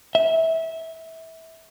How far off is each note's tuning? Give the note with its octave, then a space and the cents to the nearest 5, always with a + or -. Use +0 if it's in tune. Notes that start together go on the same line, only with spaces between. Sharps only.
E5 -20